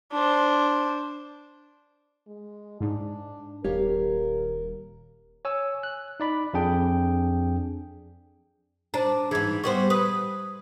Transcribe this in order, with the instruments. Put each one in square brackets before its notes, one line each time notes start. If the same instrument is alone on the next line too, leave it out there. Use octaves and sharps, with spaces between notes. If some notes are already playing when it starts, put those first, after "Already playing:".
[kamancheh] D4 C5
[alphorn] G#3
[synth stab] G#2 [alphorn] D4
[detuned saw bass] D#1 [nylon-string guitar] G4 C#5 F5 [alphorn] A#4
[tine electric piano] C#5 G#5 E6
F#6
D#4 D5 B5
F2 D4 G#4 G5
[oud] D4 [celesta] C5 A5 A#5
[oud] G#2 E3 [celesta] G#4 G#6
[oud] G3 B3 C5 [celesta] C#6
[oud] B4 [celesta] D#6